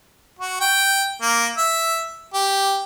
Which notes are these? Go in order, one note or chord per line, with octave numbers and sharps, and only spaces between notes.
F#4
G5
A#3
E5
G4